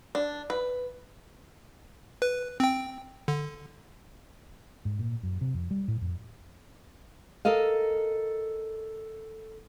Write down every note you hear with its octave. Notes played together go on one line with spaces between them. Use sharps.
D4
B4
B4
C4 G5
D3
G#2
A#2
F#2
C3
F2
G3
A2
F2
A4 A#4 D#5 F5